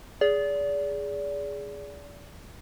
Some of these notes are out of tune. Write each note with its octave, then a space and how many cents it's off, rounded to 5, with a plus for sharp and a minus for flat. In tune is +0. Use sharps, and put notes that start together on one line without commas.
G#4 +0 D5 -30